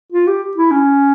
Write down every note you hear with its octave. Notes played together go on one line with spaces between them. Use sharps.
F4
G4
E4
C#4